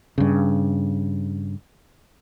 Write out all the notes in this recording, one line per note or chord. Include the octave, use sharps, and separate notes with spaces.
G2 C#3